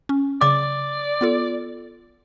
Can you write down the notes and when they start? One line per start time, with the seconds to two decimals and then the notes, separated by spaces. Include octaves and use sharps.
0.09 C#4
0.41 C#3 D5 D6 A6
1.21 B3 F4 A4